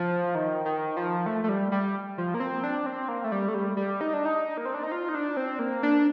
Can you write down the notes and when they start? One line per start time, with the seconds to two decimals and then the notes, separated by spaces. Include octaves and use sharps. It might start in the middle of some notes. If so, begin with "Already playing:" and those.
Already playing: F3
0.35 D#3
0.65 D#3
0.97 F3
1.26 A3
1.44 A3
1.49 G3
1.72 G3
2.18 F3
2.34 A#3
2.40 C4
2.64 D4
2.86 C4
3.08 A#3
3.24 A3
3.32 G3
3.48 A3
3.54 G3
3.77 G3
4.01 D#4
4.14 D4
4.25 D#4
4.57 A#3
4.65 C4
4.74 D4
4.83 D#4
4.92 F4
5.09 D#4
5.15 D4
5.37 C4
5.59 A#3
5.83 D4